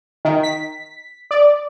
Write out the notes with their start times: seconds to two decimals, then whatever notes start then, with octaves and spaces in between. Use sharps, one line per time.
0.25 D#3
0.43 B6
1.31 D5